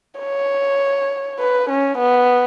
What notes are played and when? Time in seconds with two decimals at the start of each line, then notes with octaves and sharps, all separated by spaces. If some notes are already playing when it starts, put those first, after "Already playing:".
0.20 C#5
1.39 B4
1.69 C#4
1.98 B3